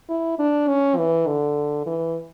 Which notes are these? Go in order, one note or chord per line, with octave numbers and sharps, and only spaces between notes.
E4
D4
C#4
E3
D3
E3